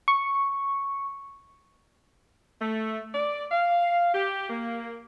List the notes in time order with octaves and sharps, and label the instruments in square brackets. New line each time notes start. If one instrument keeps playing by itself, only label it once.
[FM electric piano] C#6
[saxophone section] A3
D5
F5
G4
A#3